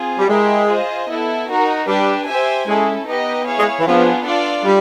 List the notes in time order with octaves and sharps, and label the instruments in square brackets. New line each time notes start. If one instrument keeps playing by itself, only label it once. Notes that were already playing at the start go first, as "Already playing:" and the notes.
Already playing: [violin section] C4 F4 G#4
[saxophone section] G3
[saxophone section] G#3 [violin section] E4 G4 A#4
[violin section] F4 G#4 C5 D#5
B3 E4 A4
D#4 F#4 A#4
[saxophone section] G3 [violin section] D4 G4 B4
[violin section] G4 C5 E5 G#5
[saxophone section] G#3 [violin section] C#4 E4 A4
[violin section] B3 D#4 G4 B4 D#5
E4 G#4 C#5 F5
[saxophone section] G#3
E3
[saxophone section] F3 [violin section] B3 D4 F4 G#4
[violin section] D4 F4 A4 D5
[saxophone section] G3